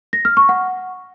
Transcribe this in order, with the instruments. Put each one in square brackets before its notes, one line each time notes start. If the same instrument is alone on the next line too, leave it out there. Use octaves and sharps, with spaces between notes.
[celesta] A#6
F6
C#6
F#5